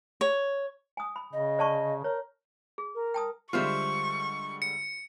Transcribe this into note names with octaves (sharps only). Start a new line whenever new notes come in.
C#5
G#5 D#6
B5
C#3 D#5
D5 A5 C#6
A#4 C#5
G#4
A#4
G5 A5 D#6
D3 G3 G#3 F4 C5 E5 C#6
C#7